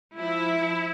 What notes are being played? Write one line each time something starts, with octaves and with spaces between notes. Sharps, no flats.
F3 E4